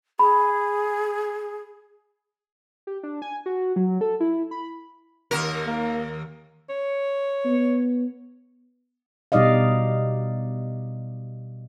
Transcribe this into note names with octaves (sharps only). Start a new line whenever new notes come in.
G#4 B5
G4
D4
G#5
F#4
F#3
A4
E4
B5
D#2 C3 A#4
A#3
C#5
B3
B2 G3 D#4 D5 D#5 F5